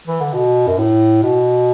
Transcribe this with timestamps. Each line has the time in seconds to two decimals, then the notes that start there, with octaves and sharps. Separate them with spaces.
0.07 E3
0.21 D3
0.34 B2
0.67 F#2
0.78 A2
1.23 B2